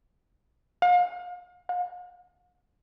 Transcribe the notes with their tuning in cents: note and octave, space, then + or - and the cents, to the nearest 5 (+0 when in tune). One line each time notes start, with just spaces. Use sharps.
F5 +40
F5 +45